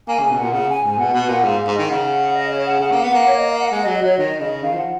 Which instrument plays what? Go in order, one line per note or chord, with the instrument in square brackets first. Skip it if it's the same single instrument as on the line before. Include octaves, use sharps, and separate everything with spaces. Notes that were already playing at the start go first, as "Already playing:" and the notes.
[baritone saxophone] A#3 [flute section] G#5
[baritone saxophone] C#3 [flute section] G#5
[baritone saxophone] B2
[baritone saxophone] A#2 [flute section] F#5
[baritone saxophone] C#3 [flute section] F#5
[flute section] G#5
[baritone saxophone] G#2 [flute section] G#5
[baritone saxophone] B2 [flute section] F#5
[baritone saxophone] B2
A#2
[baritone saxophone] G#2 [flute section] F5
[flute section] F5
[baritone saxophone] G#2
[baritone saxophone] D#3 [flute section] D#5
[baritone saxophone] C#3 [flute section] F#5
[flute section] D#5
C#5
F#5
[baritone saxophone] C#3 [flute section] F#5
[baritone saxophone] A#3 [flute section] F#5
[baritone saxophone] B3
[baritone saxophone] A#3 [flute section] F#5
[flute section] C#5
D#5
F5
F#5
[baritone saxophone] G#3 [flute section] F#5
[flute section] D#5
[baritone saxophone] F#3
[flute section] D#5
[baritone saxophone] F#3 [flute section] C#5
[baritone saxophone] D#3 [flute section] D#5
[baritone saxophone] C#3 [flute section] D#5
[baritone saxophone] D#3 [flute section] F5
[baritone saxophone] F3 [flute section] F#5